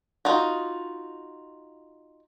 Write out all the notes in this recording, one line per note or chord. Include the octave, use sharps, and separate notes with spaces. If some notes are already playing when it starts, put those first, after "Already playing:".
D#4 F4 F#4